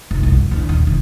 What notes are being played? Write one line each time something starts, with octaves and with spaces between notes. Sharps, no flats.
F1
C2 F2
F3
E2 D3
D#2 A#2
E1